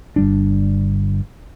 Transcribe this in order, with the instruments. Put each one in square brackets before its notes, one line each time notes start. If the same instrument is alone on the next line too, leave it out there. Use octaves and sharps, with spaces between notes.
[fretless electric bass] G1 G3 D4